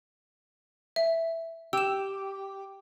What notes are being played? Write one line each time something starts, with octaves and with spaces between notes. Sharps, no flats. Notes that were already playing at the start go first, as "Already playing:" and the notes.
E5
G4 E6 E7